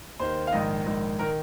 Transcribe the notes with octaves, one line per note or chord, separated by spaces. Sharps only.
D#2 D#3 C5
F5
A#1 G#2 D#3 D#5
A#1 G#2 D#3
D#3 A#4